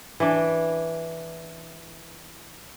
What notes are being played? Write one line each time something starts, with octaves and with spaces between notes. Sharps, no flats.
E3 D4